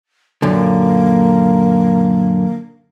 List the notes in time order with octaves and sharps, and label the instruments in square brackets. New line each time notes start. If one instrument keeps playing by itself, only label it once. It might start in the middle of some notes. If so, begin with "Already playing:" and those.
[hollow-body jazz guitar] F#2 A#2 D3 [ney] A#3